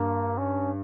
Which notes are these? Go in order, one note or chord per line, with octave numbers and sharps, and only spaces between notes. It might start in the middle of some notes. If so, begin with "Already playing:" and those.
Already playing: G2 A#3
C#4